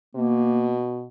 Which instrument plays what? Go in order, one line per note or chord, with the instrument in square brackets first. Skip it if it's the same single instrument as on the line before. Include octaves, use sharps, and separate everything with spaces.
[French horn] B2 [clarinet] A#3